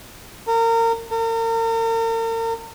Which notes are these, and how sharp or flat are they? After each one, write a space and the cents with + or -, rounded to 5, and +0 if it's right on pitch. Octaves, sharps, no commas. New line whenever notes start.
A#4 -30
A#4 -40